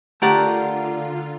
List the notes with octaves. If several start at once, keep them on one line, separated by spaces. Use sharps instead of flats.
D3 A3 F4 G4 A4 A#4 D5 F#5